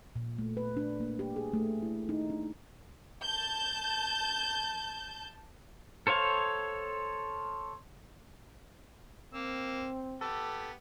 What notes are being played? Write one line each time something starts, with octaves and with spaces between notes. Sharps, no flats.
A#2
A3
B4
D4
A#3
G4
G#4
A3
E4
D#4
D4
A5 G6
A4 C5 C#5 F5
A#3 C4 E6
B3 G4 A4